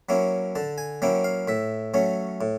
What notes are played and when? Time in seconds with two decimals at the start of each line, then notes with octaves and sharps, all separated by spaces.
0.09 F#3 A#3 C#4 E4
0.55 D3 A5
0.78 G#5
1.02 F#3 A#3 C#4 E4 G5
1.24 F5
1.48 A2 E5
1.94 F#3 A3 C#4
2.41 A2